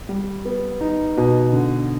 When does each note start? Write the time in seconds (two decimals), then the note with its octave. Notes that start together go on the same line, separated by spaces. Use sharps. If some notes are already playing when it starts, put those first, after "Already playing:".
0.09 G3
0.45 B3
0.81 D#4
1.17 B2
1.53 D3